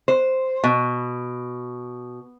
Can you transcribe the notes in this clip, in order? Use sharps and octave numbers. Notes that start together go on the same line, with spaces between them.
C5
B2